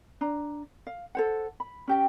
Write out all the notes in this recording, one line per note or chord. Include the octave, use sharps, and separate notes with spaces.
D4 A#5
F5
A4 C5 F#5
B5
C#4 G4 G5